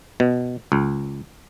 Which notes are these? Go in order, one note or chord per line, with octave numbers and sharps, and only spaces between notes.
B2
C#2